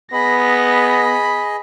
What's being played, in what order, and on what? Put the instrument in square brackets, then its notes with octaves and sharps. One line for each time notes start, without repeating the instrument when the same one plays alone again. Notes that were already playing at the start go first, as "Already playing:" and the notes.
[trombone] B3 [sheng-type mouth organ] G#4 D#5 [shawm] B5 [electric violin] A#6